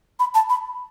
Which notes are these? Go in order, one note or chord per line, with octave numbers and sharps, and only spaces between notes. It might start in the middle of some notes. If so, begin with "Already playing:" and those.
B5
A5
B5